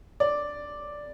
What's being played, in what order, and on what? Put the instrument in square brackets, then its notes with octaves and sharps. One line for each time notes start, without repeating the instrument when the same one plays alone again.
[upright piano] D5